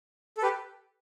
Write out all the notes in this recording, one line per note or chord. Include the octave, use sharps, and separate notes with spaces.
A4
G4 B4